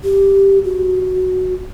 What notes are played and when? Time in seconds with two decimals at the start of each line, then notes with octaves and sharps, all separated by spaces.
0.04 G4
0.64 F#4